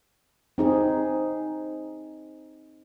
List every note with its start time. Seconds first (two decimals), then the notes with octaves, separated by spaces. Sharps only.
0.58 C4 D#4 G#4